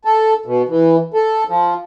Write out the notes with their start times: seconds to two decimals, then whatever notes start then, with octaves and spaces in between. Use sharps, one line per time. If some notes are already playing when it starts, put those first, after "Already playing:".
0.05 A4
0.46 B2
0.69 E3
1.14 A4
1.49 F3